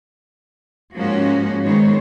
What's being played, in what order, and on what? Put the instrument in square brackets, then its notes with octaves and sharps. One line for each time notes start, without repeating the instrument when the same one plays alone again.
[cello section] G#2 F3 G#3 A#3 C#4 F#4
G#2 D#3 G#3 B3 C5 C#5